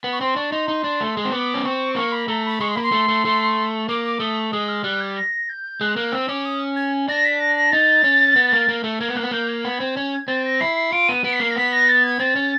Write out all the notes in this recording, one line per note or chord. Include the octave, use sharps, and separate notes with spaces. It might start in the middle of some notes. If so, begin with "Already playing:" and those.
B3
C#6
C4 C6
D4 C#6
D#4 C6
D#4
D4
A3
G#3
C4
B3 D6
C#4
C4 C#6
A#3 C#6
B5
A3 A#5
B5
G#3 C#6
C6
A#3 B5
C6
A3
A3
A3
A#3 D6
D6
A3 D#6
G#3 D#6
F6
G3 F#6
G#6
A#6
G6
G#3 F#6
A#3 F#6
C4 E6
C#4 D6
D#6
G#6
D4 A#6
B6
A#6
A#6
D#4 A6
C#4
B3
A#3
A#3
A3
A#3 G#6
B3
A#3 F#6
B3
A#3 G6
G#6
B3
C4
C#4
C4 A6
A#6
E4 C7
C7
F4 D7
B3 D#7
B3 D7
B6
A#3 C7
A#6
B3 B6
A#6
A6
G#6
C4 A6
C#4